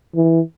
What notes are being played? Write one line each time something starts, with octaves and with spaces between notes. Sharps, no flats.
E3